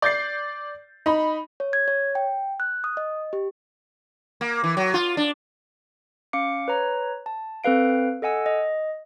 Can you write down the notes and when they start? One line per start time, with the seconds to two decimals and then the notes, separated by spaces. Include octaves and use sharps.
0.02 D5 G6 A6 C7
1.06 D#4 B5
1.60 C#5
1.73 G#6
1.88 C#5
2.15 G5
2.60 F#6
2.84 D#6
2.97 D#5
3.33 G4
4.41 A#3
4.64 E3
4.77 F#3
4.94 F4
5.17 D4
6.33 C#4 F5 D6 C#7
6.68 B4 C#5 A#5
7.26 A5
7.64 C4 A4 B4 F5 D7
8.22 A4 D#5 F#5 G#5 E6
8.46 D#5